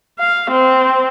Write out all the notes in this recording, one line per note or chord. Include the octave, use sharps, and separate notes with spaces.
F5
C4